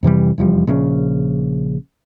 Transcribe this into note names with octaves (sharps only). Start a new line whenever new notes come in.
F2 C3 E3 G3
F1 E2 F3 G3
A#1 C#3 F3 C#4